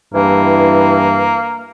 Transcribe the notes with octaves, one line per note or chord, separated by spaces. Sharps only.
G2 E3 A#3